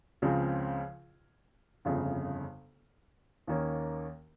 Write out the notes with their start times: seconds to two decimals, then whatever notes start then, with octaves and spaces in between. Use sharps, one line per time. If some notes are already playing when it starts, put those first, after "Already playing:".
0.22 C#2 C#3 F3 C4
1.85 G1 F2 C#3
3.47 D#2 D#3 A#3 C#4